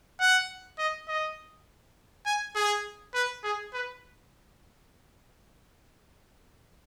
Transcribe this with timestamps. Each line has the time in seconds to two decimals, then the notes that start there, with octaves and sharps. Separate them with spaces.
0.20 F#5
0.79 D#5
1.08 D#5
2.26 G#5
2.55 G#4
3.14 B4
3.44 G#4
3.73 B4